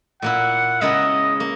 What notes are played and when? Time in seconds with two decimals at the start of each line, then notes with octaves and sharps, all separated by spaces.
0.22 A#2 A#3 E4 F#5
0.81 C#3 G#3 B3 E4 A#4 D#5
1.40 A#3